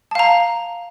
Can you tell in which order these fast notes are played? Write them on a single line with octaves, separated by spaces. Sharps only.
A5 F5 A#5